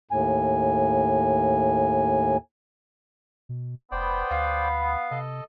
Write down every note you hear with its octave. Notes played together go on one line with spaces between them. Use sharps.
D#2 A2 G#5
B2
F1 B3 C5 D5 G5
D2 F5
C3 A4 D#5